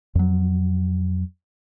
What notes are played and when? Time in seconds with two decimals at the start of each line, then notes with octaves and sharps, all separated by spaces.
0.15 F2 F#3